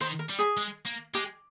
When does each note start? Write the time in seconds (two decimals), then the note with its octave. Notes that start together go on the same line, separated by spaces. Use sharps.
0.01 D#3 C5
0.19 A#4
0.29 G3
0.39 G#4
0.57 G#3
0.86 A#3
1.14 G#3 G4